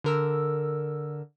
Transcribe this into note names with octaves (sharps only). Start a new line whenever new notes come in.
D3 A#4 E6